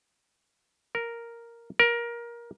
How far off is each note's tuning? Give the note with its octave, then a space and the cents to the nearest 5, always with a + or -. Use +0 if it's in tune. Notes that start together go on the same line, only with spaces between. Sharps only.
A#4 +0
A#4 +20